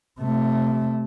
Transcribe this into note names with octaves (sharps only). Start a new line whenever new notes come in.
C3 A3